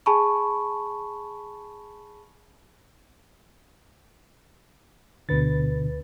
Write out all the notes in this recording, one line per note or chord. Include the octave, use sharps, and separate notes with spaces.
G#4 G#5 A5 B5 C#6
D2 B2 D3 B4 A6